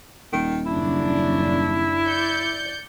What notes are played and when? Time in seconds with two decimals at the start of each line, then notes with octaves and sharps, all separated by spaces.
0.33 D#1 D#3
0.66 F#2 C#3 D4 E4
2.07 D5 G6 C#7